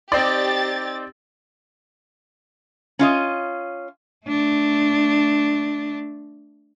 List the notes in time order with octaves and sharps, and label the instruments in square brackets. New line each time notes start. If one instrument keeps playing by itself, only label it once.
[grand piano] C4 D#4 [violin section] G4 A6 [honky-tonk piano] D5
[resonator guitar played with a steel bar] C#4 F4 D#5
[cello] A3 D4